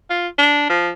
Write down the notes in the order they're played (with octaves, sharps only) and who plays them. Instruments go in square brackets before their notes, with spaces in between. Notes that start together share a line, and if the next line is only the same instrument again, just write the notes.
[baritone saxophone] F4
D4
F3